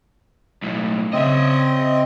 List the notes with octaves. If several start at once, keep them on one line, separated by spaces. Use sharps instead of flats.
B1 A2
C#3 C4 D#5 E5